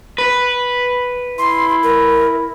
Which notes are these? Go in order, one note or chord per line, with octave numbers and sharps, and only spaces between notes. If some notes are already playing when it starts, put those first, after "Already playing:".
B4
E4 C6
A#4